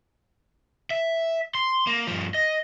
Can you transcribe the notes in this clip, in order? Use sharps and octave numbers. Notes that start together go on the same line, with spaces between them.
E5
C6
A#3
G2 F3
D#5